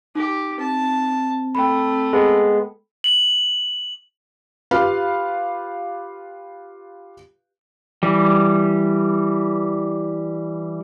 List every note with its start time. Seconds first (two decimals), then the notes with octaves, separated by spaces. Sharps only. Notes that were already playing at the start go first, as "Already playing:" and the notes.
0.15 D#4 G4
0.59 C4 A5
1.55 A3 G5 B5
2.13 G#3 B3
3.04 F#7
4.71 F4 G4 B4 F5
8.03 E3 G3